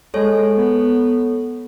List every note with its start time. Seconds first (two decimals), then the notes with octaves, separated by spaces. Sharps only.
0.14 G#3 A4 C#5
0.57 B3